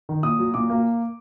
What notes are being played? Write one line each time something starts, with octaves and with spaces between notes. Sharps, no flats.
D#3
A#2 D#6
F#3
A#2 D6
A#3